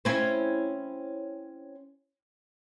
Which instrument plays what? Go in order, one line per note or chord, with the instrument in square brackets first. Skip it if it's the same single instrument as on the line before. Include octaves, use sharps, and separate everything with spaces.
[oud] C4 C#4 E4